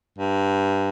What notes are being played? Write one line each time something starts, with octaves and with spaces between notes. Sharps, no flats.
G2